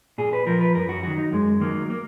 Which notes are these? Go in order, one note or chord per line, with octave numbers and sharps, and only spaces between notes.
A#2 G#4
B4
F3 A#4
B4
F#2 A#4
F#4
D#3 F#3 F#4
D#4
F#2 G#3
D#3 F#3 A#3
A#3